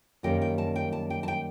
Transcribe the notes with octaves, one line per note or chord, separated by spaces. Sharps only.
F#2 D#3 G3 A#3 G5
G5
A5
G5
A5
G5
A5
G5